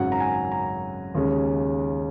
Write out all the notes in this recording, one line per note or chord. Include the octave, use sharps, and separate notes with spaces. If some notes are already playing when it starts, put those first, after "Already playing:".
Already playing: G#1 F#2 C#3 F#3 F#5
A#5
G#5
A#5
D#2 C#3 G#3 C#4